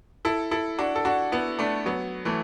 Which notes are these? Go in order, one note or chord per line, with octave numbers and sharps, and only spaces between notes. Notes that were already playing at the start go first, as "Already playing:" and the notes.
E4 A4
E4 A4
D4 F#4
A4
D4 F#4
B3 E4
A3 D4
F#3 B3
E3 A3